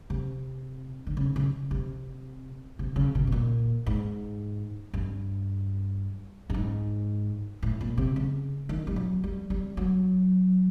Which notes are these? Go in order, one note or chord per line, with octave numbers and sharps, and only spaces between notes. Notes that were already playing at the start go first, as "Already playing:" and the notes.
C3
D3
C#3
C#3
C3
C3
C#3
B2
B2
A#2
G#2
G2
G2
G#2
A2
A#2
C3
C#3
D#3
G3
F#3
G3
G3
F#3